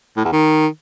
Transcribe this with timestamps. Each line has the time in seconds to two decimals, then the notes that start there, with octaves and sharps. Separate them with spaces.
0.17 A2
0.25 E2
0.32 D#3